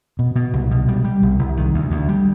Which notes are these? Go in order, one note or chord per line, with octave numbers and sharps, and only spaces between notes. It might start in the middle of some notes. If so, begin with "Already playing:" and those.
B2
B2
C2
B2
G3
G3
C2
C2
D#3
D2
D2
G3